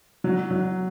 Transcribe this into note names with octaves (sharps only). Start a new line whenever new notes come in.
F#3
F#3